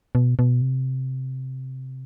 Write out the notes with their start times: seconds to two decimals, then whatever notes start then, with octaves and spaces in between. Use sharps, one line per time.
0.15 B2
0.39 B2
0.61 C3